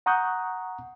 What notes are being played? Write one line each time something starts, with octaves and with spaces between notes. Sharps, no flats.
F#5 A#5 C#6 D#6 F#6 G6